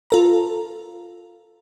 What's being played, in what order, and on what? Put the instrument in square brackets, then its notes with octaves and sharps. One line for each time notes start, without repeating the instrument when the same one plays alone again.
[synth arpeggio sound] F4 A4 A#5